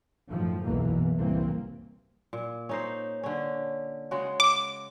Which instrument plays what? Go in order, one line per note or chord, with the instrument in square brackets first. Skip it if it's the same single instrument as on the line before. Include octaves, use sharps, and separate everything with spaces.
[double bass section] F#2 A2 D#3 F3
F#1 B1 E2 B2 E3 A#3
F#1 C2 A2 E3 A#3 C4
[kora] A#2
C#4 D#4 C5
D3 C#4
C#3 G#3 F#4
[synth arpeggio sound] D6